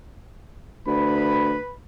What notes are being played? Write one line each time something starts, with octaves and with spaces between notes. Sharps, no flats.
D2 B4 B5